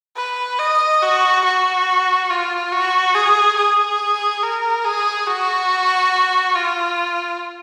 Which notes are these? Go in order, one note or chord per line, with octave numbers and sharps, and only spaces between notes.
B4
D#5
F#4
F#4
F4
F#4
G#4
G#4
A#4
G#4
F#4
F4